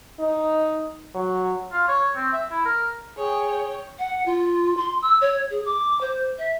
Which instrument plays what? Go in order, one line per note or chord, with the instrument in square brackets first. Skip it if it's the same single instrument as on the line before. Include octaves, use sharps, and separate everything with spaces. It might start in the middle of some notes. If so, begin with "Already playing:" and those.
[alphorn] D#4
F#3
[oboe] F4
C#5
C4
E5
E4
A#4
[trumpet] G#4 [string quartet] C#5 G5
[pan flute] F#5
F4
C6
E6
C#5
G#4
D6
C5
E5